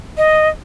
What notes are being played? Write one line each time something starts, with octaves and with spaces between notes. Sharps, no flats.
D#5